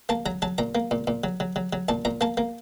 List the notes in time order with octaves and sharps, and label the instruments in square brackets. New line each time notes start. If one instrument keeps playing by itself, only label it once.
[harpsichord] A#3 A5
F#3 A#5
F#3 A5
A#2 A#5
A#3
A#2
A#2
F#3
F#3
F#3
F#3
A#2 A5
A#2 A#5
A#3 A5
A#3